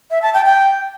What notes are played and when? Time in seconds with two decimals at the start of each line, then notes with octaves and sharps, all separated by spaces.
0.11 E5
0.22 A5
0.34 G5
0.45 G5